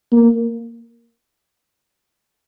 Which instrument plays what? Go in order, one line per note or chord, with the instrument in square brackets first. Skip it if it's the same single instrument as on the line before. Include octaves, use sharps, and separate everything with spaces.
[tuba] A#3